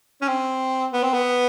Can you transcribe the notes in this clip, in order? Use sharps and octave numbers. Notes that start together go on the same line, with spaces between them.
C#4
C4
B3
C4
B3